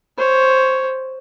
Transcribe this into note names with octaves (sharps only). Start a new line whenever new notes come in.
C5 C#5